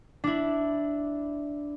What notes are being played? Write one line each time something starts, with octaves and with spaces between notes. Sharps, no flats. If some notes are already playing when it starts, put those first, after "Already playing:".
D4 E4